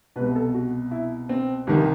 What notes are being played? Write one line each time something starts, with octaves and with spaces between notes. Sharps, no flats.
C2 B2 B4
A4
F#4
E4
C4
C2 C3 D#3